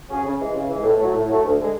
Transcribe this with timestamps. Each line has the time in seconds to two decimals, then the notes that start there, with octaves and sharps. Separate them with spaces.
0.09 C#3 F#3 C#4 G#4
0.23 C#3
0.39 E3 G#3
0.54 C#3
0.69 E3 G#3
0.83 A2
0.99 F#3 A3
1.13 A2
1.28 F#3 A3
1.43 D2
1.58 D3 G#3